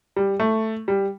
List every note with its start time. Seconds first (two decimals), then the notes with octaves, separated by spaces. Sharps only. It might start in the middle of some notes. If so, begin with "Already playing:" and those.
0.16 G3
0.40 A3
0.88 G3